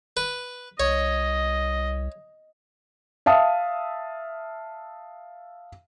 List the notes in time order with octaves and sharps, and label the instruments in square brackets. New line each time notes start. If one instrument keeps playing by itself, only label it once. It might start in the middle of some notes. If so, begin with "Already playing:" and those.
[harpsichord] B4
[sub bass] C2 [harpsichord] C#5 [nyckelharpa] D#5
[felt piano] E5 F5 A5 D#6